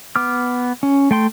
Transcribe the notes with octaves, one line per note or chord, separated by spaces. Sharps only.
B3 D6 F6
C#4
A3 G5 C6